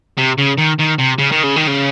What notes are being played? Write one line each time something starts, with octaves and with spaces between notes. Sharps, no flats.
C3
C#3
D#3
D#3
C3
C#3
D#3
C#3
D#3
C#3